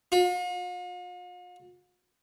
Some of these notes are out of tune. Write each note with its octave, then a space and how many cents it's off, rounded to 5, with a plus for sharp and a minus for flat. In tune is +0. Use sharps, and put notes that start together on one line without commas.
F4 +45